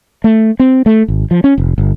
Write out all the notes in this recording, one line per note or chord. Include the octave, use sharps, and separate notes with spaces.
A3
C4
A3
G#1
F3
C#4
F1
G1